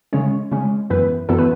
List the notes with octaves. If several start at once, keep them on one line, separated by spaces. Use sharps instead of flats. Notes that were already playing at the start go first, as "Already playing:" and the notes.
C#3 G#3 C#4 C#5
C#3 G#3 C#4
F#2 E3 B3 E4 B4
F#2 E3 B3 E4 A4
B4